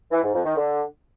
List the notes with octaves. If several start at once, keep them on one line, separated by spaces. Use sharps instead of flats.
E3
G#2
F2
D#3
D3